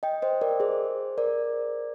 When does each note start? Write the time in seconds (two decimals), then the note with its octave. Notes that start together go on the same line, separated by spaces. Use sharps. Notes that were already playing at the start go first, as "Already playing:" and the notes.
0.03 D#5 G5
0.22 C5 D#5
0.41 A#4 D5
0.60 G#4 C5
1.18 A#4 D5